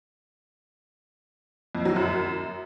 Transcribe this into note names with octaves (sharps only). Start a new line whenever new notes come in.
F2
F#3
F#2